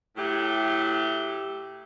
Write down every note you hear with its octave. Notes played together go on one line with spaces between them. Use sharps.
A2 F#3 A3 E4 G4